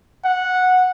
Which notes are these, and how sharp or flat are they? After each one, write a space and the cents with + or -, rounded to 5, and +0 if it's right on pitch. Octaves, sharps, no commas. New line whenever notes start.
F#5 -10